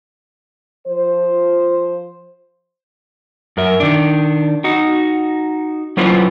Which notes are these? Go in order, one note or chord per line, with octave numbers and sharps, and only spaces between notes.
F3 C5
F#2 A#4 E5
D#3 D4
D#4 F#4
F#3 C#4 E4 F4 B4 C5